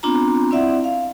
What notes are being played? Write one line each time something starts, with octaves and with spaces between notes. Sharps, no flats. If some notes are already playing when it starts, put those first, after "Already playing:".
B3 C4 D4 F4 A#5
C4 E4 D5 E5 F#5
F5